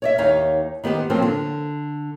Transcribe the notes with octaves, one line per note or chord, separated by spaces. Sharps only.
C#5 D5 E5
D#2 D#4 C#5 E5 F5
D#3 B3 G4 C5
F3 F#3 A#3 C4 F4
D3